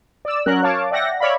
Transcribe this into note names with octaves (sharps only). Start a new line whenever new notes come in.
D5 E6
F#3 C#4 A#4 F#6
C#5 F5 A5 D6
D5 E5 F#5 G5 A#6
C#5 D5 E5 F5 B5